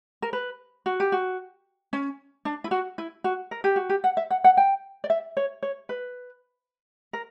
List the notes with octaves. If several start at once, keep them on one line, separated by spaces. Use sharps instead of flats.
A#4
B4
F#4
G4
F#4
C#4
D4
E4
F#4
E4
F#4
A#4
G4
F#4
G4
F#5
E5
F#5
F#5
G5
D5
E5
C#5
C#5
B4
A#4